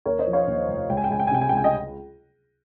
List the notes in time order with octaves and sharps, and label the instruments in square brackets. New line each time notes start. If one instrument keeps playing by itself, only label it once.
[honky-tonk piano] D#2 A#4 C#5
C5 D#5
F3
C#5 F5
D#2
F1
C#2 G5
G#5
G5
C#2 G#5
G5
G#5
C3 G5
G#5
G5
C#2 G#5
D#5 G5